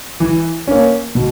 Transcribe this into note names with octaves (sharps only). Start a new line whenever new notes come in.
E3
A#3 C#4
B2